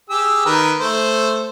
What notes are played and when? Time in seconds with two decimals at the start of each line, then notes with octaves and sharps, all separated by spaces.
0.10 G4 G#4 E6
0.45 D#3 A#4 B4
0.80 A3 C5